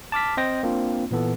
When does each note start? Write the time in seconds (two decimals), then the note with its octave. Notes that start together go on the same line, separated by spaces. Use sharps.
0.12 A5 D6 F6 B6
0.37 C4 C5 D#5 G5 A#6
0.63 A#3 C4 D4 F4
1.11 A#2 E3 B3 A4